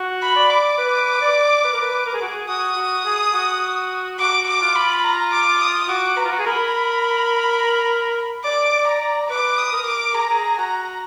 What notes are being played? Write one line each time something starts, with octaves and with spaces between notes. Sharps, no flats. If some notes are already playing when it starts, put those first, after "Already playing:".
Already playing: F#4
B5
D5
D6
B4
D5
B4
A#4
B4
A#4
G#4
F#4
G#4
F#4 D#6
F#4
G#4
F#4
F#4 D6
D6
F4
B5
A#5
D6
D#6
F#4 D6
B4 A#5
F4
F#4
G#4
A#4 B5
D5 D6
D5
A#5
D5
B4 D6
D#6
A#4
D6
G#4 A#5
A#4
G#4
F#4 A#5